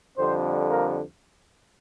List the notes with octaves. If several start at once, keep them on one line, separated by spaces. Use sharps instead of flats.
F2 D3 G3 C4 C5
A#3 A#4